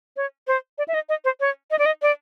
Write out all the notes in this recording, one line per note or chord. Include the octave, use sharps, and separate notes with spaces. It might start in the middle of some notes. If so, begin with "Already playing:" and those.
C#5
C5
D5
E5
D#5
D#5
C5
C#5
D#5
D5
D#5
D5